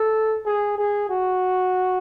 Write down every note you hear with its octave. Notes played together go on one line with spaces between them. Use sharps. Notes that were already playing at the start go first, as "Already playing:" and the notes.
Already playing: A4
G#4
G#4
F#4